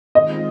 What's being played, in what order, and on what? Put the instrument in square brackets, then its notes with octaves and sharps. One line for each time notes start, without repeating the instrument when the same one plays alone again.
[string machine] D#3 G#3 C4 F4 [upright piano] D#5